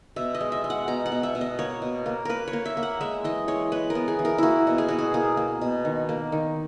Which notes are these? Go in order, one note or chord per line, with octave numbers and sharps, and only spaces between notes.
B2 E5
D#5
G#3
E5
G#3
F#5
B2 A#5
F#5
B2
E5
B2
D#5
A#3 C#5
B2
A#3
A#3 A#4 B4
C#5
A#3
E5
A#3
F#5
G#3 E5
E3 D#5
G#3 C#5
G#3 B4
A#4
B3
G#4
E3
A#4
A#3 E4 F#4
B2
G#4
B2 F#4
G#4
A#3 G#4
A#3
B2
D#3
A#3
D#3